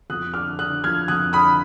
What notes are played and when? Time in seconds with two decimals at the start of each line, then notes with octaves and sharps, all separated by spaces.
0.10 F2 D#6 F#6
0.34 D3 D6 F6
0.59 D3 D#6 F#6
0.84 F3 F6 G#6
1.08 F2 D#6 F#6
1.33 D3 B5 D#6